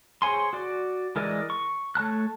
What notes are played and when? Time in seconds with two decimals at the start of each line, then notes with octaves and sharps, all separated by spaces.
0.22 G#4 C5 C#5 G#5 C6
0.53 F#4 D5
1.16 E3 G#3 A#4 D5 D#5
1.50 C#6
1.95 A3 C#5 A5 F#6